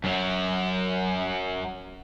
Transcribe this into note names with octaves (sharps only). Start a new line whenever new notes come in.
F#2 F#3